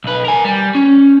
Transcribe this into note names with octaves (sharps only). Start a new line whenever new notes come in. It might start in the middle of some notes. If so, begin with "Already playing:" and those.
B1 B4
A#4 G#5
G3
C#4